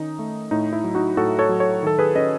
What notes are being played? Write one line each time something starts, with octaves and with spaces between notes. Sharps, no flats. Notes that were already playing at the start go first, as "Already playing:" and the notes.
Already playing: D#3 C#4 D#4
A3
A2 D#4
E4
F#3
D#4 F#4
A2 F#4 A4
A4 C#5
F#3
A4 C#5
D#3 A4
G#4 B4
C#4 B4 D#5